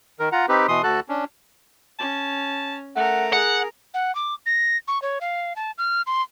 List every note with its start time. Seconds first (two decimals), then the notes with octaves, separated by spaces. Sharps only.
0.20 D#3 A#4
0.32 F4 F#5 A#5
0.49 C4 D#4 G4 B4
0.68 B2 E3 C6 D#6
0.83 D2 F#4 A4 A5 F#6
1.09 C#4 D4
1.99 C#4 A5
2.96 A3 A#4 F#5
3.33 G#4 F#5
3.94 F#5
4.15 D6
4.46 A#6
4.88 C#6
5.02 C#5
5.21 F5
5.56 A5
5.78 F6
6.06 C6